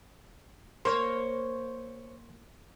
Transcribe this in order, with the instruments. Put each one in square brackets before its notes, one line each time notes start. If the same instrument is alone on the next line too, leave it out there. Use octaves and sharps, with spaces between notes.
[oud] A#3 [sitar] C5 C#5 [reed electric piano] C6 C#6